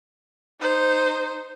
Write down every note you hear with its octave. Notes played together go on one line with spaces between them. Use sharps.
D#4 C5